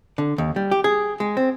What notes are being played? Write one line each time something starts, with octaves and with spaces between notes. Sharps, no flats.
D3
D#2
G3
G4
G#4
G#3
C4